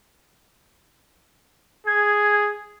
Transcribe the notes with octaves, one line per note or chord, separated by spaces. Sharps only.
G#4 G#6